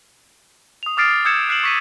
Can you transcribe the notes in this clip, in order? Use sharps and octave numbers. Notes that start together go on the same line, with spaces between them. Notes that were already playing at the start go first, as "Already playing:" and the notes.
D#6 F7
D6 D#6 F6 A6 C7 D7
D#6 E6 G6 G#6 C#7 E7
F6 F#6 C7 D7 E7 F#7
C#6 B6 D#7